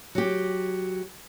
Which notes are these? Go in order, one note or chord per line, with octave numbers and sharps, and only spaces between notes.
F#3 G4